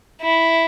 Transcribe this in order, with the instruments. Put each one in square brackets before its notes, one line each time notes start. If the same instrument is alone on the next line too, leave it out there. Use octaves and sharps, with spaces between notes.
[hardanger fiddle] E4